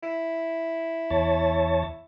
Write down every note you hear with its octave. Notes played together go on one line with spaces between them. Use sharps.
E4
E2 C#5 A5